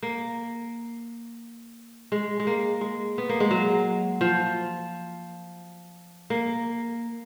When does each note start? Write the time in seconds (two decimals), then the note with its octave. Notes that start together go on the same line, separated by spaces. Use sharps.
0.03 A#3
2.12 G#3
2.40 G#3
2.47 A#3
2.81 G#3
3.18 B3
3.29 A#3
3.40 G#3
3.51 F#3
4.21 F3
6.30 A#3